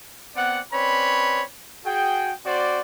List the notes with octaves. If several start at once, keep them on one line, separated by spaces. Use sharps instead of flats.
B3 C4 D5 F#5
C4 C#4 B4 C#5 D5 B5
F#4 G#4 G5
C4 F#4 C5 D5